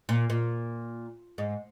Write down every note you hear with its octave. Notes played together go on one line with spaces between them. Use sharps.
A#2
A#2
G#2